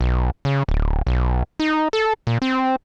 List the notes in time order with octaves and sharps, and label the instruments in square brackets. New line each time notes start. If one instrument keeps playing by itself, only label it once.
[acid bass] B1
C#3
D1
B1
D#4
A4
A#2
C4